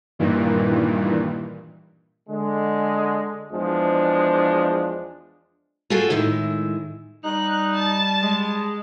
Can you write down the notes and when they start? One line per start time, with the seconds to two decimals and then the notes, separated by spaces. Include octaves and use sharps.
0.19 G2 A#2 D#3 E3
2.29 D3 G#3
3.51 E2 F3 G#3 D4
5.90 F4 F#4 G#4 A4 G5
6.10 A2 D#3 G#3 E4
7.24 G3 D#4 F#6
7.74 A5
8.22 G#3